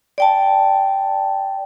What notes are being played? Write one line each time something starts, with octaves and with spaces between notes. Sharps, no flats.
D5 G5 A5